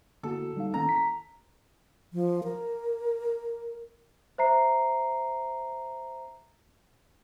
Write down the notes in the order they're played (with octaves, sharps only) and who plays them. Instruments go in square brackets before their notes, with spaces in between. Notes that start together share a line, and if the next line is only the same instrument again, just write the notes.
[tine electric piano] D3 A#3 F#4 [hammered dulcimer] A4
[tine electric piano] G3 D#4 F5
[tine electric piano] D#3 A#3 C#4 [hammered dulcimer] A#5
[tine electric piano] B6
[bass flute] F3
A#4
[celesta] C5 E5 A#5 C7